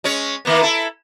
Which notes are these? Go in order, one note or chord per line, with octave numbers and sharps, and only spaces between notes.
G#3 C#4 C#5
D#3 A#3 B3
E4 A4